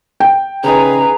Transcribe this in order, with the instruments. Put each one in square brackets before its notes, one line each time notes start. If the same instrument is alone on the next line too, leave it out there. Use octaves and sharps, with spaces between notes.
[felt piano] G5
[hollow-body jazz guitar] C#3 D#4 [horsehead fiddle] G#4 B4 [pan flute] A#5